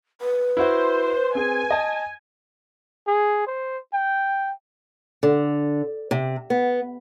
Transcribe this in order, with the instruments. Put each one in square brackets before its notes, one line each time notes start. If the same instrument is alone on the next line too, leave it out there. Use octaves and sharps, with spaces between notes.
[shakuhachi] B4
[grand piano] E4 F#4 [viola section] C5
[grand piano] C4 G#4 [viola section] G#5
[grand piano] D#5 A5
[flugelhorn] G#4
C5
G5
[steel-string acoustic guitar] D3
C3
B3